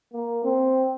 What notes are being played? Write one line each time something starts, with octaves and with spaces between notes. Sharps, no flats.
A#3
C4